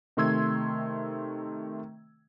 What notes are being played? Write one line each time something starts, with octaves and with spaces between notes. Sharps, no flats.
C3 D#3 A3 C6 E6 G#6